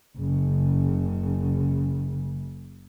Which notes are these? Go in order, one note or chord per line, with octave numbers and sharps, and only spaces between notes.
F#1 C#3